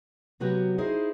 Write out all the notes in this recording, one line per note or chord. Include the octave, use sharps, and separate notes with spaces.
C3 F#3 B3 F#4 G4
D#4 E4 G#4 C5